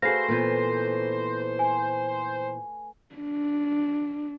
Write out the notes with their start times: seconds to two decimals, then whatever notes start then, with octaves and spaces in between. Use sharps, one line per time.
0.02 A3 F#4 G#4 B4 C5 F5 A#6 C7
0.28 A#2 E3 B3
1.59 G#5
3.15 D4